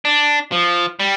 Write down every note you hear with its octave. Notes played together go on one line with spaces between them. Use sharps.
D4
F3
G3